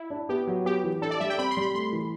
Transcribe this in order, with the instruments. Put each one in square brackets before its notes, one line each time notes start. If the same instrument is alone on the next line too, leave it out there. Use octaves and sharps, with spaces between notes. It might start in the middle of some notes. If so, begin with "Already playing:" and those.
Already playing: [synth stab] E4
[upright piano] D4
[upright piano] B3 [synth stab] G4
[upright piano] F#3
[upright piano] B3 [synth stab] G4
[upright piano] E3
[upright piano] D4 [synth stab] A4
[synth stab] D5
[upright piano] G3 [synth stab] E5
[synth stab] G5
[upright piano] C4 [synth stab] B5
[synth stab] C6
[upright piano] G3
[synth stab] B5
[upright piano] A3 [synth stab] C6
[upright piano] E3